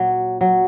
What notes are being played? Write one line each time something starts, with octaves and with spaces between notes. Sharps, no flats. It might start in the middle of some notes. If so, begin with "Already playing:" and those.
Already playing: A#2 F#3
F#3